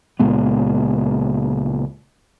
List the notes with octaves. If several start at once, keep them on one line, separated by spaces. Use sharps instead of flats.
C#2 A#2 G#3 B3